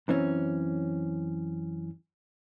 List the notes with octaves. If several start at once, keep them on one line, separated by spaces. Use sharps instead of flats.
F#2 E3 C4 C#4